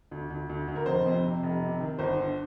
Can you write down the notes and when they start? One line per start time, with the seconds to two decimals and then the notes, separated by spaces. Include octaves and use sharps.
0.11 D2
0.30 D2
0.49 D2
0.68 D2
0.76 A#4
0.86 F1 C5
1.06 F2
1.24 C3
1.43 F1
1.62 C3
1.81 D#3
1.99 G1 C5
2.18 D3